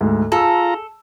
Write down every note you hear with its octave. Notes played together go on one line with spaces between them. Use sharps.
D2 G#2
F4 G#4 A4 A#5 E6